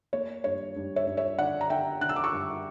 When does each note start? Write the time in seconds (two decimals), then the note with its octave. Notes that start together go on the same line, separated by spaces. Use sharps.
0.13 A#3 C#5
0.44 G2 C#5
0.76 G2
0.96 C#5 E5
1.07 G2
1.17 C#5 E5
1.39 D3 D5 F#5
1.61 A#5
1.70 D3 E5 G5
2.01 D3 F#6
2.09 E6
2.16 D6
2.24 C#6 E6
2.33 G2